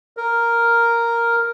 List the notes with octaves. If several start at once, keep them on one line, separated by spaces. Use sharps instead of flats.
A#4